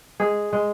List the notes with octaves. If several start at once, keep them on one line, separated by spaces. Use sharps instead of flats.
G#3 G#4
G#3